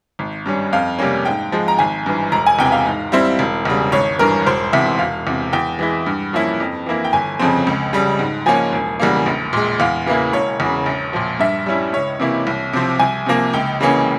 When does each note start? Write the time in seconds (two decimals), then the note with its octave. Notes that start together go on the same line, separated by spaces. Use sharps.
0.19 G#1
0.46 G2 G3 C#4
0.73 F2 F5
0.98 C3 G3 A#3 C#4
1.25 G#2 G5
1.52 F3 G#3
1.68 A#5
1.79 G#1 G#5
2.06 G2 E3
2.32 E1 A#5
2.46 G#5
2.59 E2 C3 E3 G5
2.72 F5
2.86 G#2
3.12 G3 C4 E4
3.39 E1
3.65 E2 C#3 G3
3.92 G#1 C#5
4.19 G2 E3 A#4
4.46 E1 C5
4.73 E2 C3 E5
4.99 E1 F5
5.27 E2 C3
5.53 E2 G5
5.79 E3 G#3 E4
6.06 G2
6.33 F3 A#3 C#4 E4
6.60 F2
6.86 E3 A#3 E4
7.04 G5
7.13 G1 G#5
7.39 F2 C#3 F3 C4
7.67 C#2
7.93 C#3 G3
8.19 G#2
8.46 F3 A#3 C#4 G#5
8.73 E1
9.00 E2 C#3 G3 A#3
9.26 A#1
9.53 A#2 G#3
9.80 E2 F5
10.06 C#3 E3 A#3 E4
10.33 E1 C#5
10.60 E2 C#3
10.86 A#1
11.13 A#2 F3
11.39 G2 E5
11.66 G3 C#4 E4
11.93 C#2 C#5
12.19 C3 E3 A#3 E4
12.47 C2
12.73 C3 F3 C4
12.99 C2 G#5
13.26 C3 F3 A#3
13.53 C#2 G5
13.81 C#3 E3 A#3 C#4